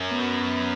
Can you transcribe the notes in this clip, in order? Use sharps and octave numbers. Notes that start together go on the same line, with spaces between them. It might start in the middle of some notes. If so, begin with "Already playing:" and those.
Already playing: F#2
B3